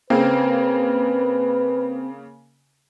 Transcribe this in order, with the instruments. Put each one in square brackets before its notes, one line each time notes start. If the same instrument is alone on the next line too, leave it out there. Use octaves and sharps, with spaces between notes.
[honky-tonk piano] C#3 A#3 [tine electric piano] C4 [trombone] B4